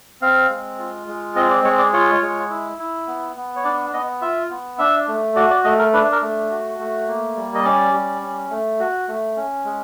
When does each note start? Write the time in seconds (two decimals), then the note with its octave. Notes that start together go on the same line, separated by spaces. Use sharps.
0.21 C4 F5
0.50 G#3
0.78 F4
1.07 G#3
1.36 C4 D#5
1.50 D5
1.64 G#3 C#5
1.78 D5
1.93 F4 C#5
2.22 G#3
2.50 E4
2.79 E4
3.07 B3
3.36 B3
3.56 C#5
3.64 D4 D5
3.93 B3 D#5
4.22 F4 E5
4.50 B3
4.78 D4 E5
5.08 A3
5.35 F#4 D5
5.51 D5
5.64 A3 D#5
5.79 A#4
5.93 D4 B4
6.12 A#4
6.22 A3
6.51 F#4
6.79 A3
7.08 A#3
7.36 G3
7.55 D#5
7.64 C#4 D5
7.93 G3
8.23 C#4
8.50 A3
8.80 F#4
9.08 A3
9.36 C#4
9.65 G#3